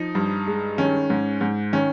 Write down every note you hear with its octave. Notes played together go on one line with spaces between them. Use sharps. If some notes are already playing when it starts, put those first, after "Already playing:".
Already playing: F3 D#4
G2
G#3
D#3 C#4
G#2
G#2
D#3 C#4